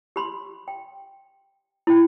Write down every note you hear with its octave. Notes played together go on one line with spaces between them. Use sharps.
G4 B5 C6
G5
E4 G5